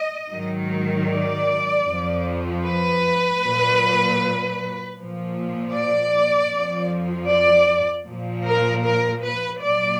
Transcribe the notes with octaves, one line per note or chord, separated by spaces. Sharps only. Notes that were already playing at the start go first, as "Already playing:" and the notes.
Already playing: D#5
G#2 D#3 F#3
D5
F2 F3
B4
A#2 F#3
A#2 F3
D5
F2 F3
D5
A#2 F3
A#4
A#4
B4
A#2 F#3 D5